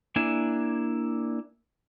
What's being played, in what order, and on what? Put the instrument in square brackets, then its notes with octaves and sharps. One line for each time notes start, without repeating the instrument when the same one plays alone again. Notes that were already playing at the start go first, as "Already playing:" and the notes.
[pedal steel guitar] A#3 D4 E4 G#5